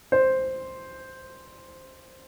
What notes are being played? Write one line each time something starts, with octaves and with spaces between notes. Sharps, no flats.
C5